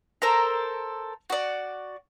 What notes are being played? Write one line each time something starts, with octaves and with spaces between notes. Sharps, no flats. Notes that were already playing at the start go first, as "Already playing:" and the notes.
A4 A#4 C5 A#5
F#4 D5